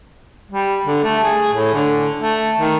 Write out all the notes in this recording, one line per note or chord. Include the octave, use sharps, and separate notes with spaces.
G3
D3
A3
G#4
A2
D3
A3
D#3